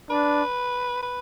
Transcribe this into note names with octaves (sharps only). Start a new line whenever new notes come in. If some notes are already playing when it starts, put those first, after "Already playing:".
D4 B4
B4